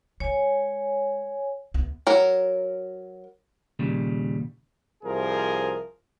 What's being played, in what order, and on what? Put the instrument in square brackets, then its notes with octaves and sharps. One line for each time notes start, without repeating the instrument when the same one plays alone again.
[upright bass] G#3 [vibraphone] C#5 G#5
[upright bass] D2 B3
[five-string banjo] F#3 A#4
[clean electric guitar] D#2 A#2 C#3 G3
[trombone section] C2 F3 G#4 A#4